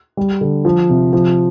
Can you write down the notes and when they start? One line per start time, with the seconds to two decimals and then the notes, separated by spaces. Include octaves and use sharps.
0.17 G3
0.41 D3
0.65 F3
0.89 C3
1.13 F3